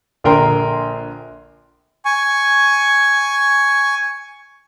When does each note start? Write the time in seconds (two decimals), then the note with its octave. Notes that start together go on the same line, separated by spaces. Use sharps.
0.24 A#1 D3 A#4 G5 C6
2.05 G#5 C#6